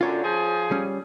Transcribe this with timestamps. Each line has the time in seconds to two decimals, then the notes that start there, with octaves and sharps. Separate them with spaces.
0.01 F#2 D3 F4 C#5
0.23 F3 G#4
0.71 G3 C#4